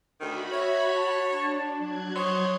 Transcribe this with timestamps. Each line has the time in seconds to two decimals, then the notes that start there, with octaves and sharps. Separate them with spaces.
0.21 D2 D#3 F#4 B5
0.53 C#5 E5
0.95 A5
1.30 D4
1.79 F#3 F#6 G#6
2.16 D#4 C5 C#5